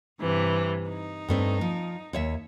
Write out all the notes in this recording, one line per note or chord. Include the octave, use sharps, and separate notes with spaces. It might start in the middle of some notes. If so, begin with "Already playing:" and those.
G2 C3 E3
D#4
G2 A3 C4
F3
D#2 C#5 E5